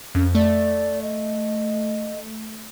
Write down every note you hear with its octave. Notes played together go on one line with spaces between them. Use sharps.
F2 C#4
A3 D5
D#5